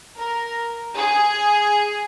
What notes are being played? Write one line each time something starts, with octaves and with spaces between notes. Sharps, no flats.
A#4
G#4